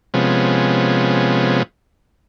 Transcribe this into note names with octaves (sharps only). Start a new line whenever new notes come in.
C3 F3 G#3 B3 C#4